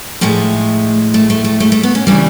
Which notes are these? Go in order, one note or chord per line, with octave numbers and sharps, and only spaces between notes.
A2 F3 G#3 A3
A3
A3
A3
A3
A3
B3
C#4
C#3 E3 G3 D4